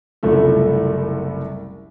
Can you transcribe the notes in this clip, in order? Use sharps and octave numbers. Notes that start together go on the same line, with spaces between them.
F#1 C2 F3 A3 A4